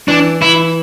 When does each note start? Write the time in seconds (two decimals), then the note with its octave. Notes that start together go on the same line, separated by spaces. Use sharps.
0.08 E3 D4
0.41 E3 E4